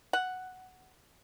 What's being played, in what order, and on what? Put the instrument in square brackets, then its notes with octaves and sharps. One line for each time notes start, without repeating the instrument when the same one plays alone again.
[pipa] F#5